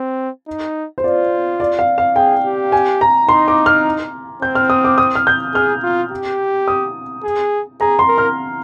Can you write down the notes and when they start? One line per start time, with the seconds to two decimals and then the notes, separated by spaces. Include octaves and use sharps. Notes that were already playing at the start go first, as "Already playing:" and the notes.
Already playing: C4
0.48 D#4
0.98 C5
1.04 F4 D5
1.60 D5
1.79 F5
1.98 F5
2.16 G#4 G5
2.44 G4
2.72 G#5
3.01 A#5
3.29 D#4 C6
3.48 D6
3.66 F6
4.42 C4 G6
4.55 F6
4.70 D#6
4.85 D6
4.98 D#6
5.15 F6
5.27 G6
5.54 G#4 F6
5.83 F4
6.12 G4
6.68 D#6
7.24 G#4
7.80 G#4 A#5
7.99 C6
8.08 A#4
8.18 F6